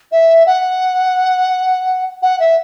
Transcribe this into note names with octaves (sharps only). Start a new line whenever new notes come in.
E5
F#5
F#5
E5